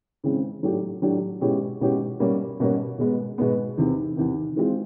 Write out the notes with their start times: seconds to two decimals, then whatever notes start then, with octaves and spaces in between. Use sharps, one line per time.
0.24 C#3 E3 G#3 C4
0.63 A2 F#3 A3 D4 G4
1.02 A2 F#3 A3 D4 G4
1.41 B2 G#3 C#4 E4 G4
1.81 B2 G#3 C#4 E4 G4
2.20 B2 G3 A#3 C#4
2.60 B2 G3 A#3 C#4
2.98 B2 G#3 B3
3.38 B2 G#3 B3
3.77 E2 C3 D#3
4.16 E2 C3 D#3
4.56 E3 G#3 C4 F4